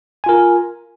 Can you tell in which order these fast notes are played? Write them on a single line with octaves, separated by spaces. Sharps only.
G#5 F4 A#4